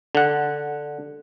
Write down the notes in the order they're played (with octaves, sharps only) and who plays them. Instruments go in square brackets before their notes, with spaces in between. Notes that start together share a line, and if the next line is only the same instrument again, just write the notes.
[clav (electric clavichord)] D3 F#5